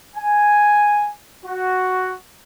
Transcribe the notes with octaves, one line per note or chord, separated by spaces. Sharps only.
G#5
F#4